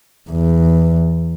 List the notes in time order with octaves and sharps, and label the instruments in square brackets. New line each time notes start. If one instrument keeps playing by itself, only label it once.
[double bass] E2